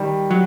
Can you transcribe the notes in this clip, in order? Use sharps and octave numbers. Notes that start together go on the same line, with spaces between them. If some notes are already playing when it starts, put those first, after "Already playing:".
Already playing: D#3 G3
F#3